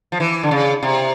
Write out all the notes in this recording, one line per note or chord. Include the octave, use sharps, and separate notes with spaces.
F3
E3
D3
C#3
C3